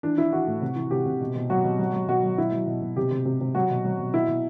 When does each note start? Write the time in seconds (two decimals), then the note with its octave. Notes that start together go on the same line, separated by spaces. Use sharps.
0.03 E3 D4
0.17 E3 E4
0.32 E3 F#4
0.47 A2
0.62 C3
0.76 E3
0.91 C3 G4
1.06 C3
1.21 B2
1.36 B2
1.50 F#3 F#4
1.64 B2
1.79 F#3
1.93 F#3
2.08 B2 F#4
2.23 F#3
2.38 B2 E4
2.52 F#3
2.67 B2
2.82 B2
2.96 C3 G4
3.11 C3
3.25 C3
3.41 C3
3.55 F#3 F#4
3.70 B2
3.85 F#3
3.99 B2
4.14 B2 E4
4.28 B2